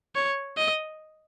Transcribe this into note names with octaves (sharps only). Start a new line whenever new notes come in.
C#5
D#5